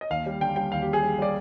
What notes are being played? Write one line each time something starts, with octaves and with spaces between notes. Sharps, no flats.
D#5
D#2 F5
G3
D3 G5
G3 G5
D#2 F5
G4
G3
G#4
G3
G3 D5